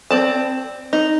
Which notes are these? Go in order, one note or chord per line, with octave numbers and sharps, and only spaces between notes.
C4 D5 A5
D#4